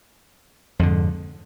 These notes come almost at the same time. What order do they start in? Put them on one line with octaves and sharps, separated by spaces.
F2 D3 G#2